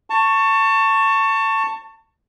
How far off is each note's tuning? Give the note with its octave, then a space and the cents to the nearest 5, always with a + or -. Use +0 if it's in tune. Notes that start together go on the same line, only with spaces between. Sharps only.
A5 +25 C#6 +0